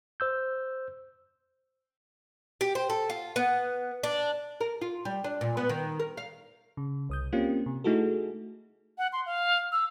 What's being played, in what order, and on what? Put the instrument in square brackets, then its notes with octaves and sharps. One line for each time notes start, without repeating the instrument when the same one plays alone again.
[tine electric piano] C5 E6 G6
[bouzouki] G4
C5
A4
F4
B3
D4
[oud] A#4
F4
G3
D4
A#2
B3
D#3
A#4
F5
[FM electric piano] C#3
C2 D#6 G6
A#3 C4 C#4 F4 G4
C3
A3 D#4 E4 F#4 G#4 A4
[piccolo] F#5
C6
F5
E6